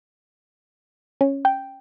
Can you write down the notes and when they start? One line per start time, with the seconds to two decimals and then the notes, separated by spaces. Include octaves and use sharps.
1.21 C#4
1.45 G5